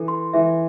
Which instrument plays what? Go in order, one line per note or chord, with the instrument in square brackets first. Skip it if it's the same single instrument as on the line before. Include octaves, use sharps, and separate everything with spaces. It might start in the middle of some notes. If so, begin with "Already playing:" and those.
Already playing: [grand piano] E3 [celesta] A4
[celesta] C6
[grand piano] E3 [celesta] E5